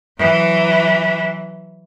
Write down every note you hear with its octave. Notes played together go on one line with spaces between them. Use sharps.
E3 F#3